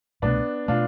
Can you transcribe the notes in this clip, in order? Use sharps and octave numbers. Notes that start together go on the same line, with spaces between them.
C2 B2 A3 B3 D4
B2 A3 D4 F4